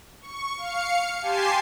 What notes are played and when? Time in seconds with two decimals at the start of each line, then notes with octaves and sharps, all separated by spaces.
0.21 C#6
0.57 F5 C#7
1.21 G4 G#5 A5 C6 C7